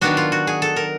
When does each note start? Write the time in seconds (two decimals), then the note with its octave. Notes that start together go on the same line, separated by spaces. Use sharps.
0.01 D#3 F#3 B3 D4 F#4
0.17 F4
0.32 F#4
0.47 G#4
0.62 A4
0.76 A#4